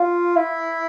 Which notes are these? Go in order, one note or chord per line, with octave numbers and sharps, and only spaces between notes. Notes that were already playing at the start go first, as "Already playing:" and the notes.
Already playing: F4
E4